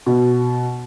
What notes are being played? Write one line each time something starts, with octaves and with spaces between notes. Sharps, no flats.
B2